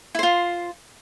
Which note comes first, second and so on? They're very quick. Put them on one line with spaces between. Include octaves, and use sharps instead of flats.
E4 C5 F4